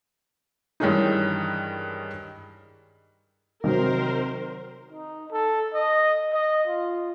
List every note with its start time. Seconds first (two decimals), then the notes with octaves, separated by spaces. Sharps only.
0.80 G2 D#3 E3 G#3 C#4 D#4
3.64 C3 D#3 F#3 A#4 C5
4.91 D#4
5.31 A4
5.74 D#5
6.33 D#5
6.68 F4